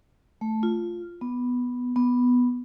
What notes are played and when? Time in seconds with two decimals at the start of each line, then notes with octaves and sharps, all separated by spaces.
0.41 A3
0.63 F4
1.21 B3
1.96 B3